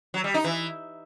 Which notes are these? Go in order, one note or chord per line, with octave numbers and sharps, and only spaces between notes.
F#3
G3
D#4
E3